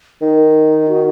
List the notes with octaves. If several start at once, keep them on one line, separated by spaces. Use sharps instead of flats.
D#3 D#4
F#4